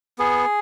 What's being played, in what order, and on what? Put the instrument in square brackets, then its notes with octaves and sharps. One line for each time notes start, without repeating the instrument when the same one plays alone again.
[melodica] B3 G#4